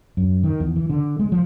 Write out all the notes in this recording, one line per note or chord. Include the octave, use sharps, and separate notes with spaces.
F#2
D#3
E2
E3
D3
G#3
F3